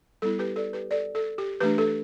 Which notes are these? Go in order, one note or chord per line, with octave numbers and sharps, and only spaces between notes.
G3 B3 E4 A4
G4 B4
A4 D5
G4 B4
A4 D5
A4
G4
E3 A3 D4 G4 B4
A4